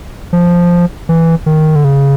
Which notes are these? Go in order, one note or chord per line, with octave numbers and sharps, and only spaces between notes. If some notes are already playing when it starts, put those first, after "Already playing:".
F3
E3
D#3
D3
C#3